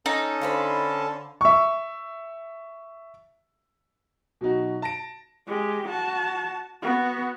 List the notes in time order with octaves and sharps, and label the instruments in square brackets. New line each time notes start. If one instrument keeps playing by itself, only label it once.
[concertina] C#4 A4 A5 [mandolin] D#4
[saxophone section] D3 [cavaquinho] F4 C5 B5
[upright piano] E5 C#6
[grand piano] B2 F#3 D#4 F#4
A5 A#6 D7
[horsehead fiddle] G#3 G4
F#4 A5
B3 F#4